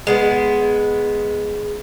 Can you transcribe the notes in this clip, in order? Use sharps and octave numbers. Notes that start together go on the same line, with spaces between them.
G#3 B3